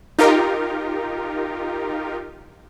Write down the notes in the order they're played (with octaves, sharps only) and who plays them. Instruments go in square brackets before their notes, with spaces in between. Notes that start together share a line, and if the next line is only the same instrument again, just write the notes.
[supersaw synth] D#4 F4 G4 A#4